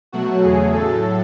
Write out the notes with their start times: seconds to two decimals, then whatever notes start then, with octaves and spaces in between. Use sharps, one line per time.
0.12 B2 F#3 A3 F#4
0.43 E2 C#3 F#3 A3 G#4
0.74 A2 F#3 A3 A4